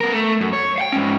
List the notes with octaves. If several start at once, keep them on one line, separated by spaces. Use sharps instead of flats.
B3 A#4
A3
F#2
C#5
F5 G5
G#2 C#4